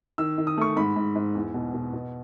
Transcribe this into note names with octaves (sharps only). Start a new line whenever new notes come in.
D#3 E6
D#3
D#6
A3 C#6
G#2 B5
G#2
G#2
E2
B2
B2
B2